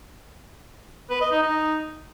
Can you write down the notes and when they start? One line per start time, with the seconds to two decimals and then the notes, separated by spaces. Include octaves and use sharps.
1.10 B4
1.21 D#5
1.32 D#4
1.43 D#4